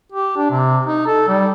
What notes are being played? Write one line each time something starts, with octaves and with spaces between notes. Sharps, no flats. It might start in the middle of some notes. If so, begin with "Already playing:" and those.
G4
D4
C3
D#4
A4
G3